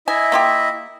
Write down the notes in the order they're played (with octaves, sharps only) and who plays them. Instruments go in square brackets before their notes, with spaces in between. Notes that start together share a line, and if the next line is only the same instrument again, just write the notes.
[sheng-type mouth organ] E4 D#5 E5 [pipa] G#5
[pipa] A#3 F4 G4